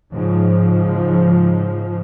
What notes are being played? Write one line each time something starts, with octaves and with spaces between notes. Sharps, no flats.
G#2 C#3 F3